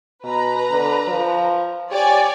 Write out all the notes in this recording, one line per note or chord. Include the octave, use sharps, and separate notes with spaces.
B2 B4 A#5
D3
F3
G4 C#5 D5 G#5